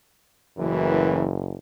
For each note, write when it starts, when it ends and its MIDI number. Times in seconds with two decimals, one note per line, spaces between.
0.58 1.56 30
0.58 1.25 42
0.58 1.25 45
0.58 1.25 52